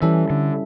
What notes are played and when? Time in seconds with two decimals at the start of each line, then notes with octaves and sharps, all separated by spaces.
0.02 E3 G3 C#4 E4 A4 E5
0.30 D3